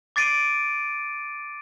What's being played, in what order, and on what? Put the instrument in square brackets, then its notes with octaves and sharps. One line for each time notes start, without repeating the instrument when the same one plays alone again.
[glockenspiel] D6 A6 C7 D7 D#7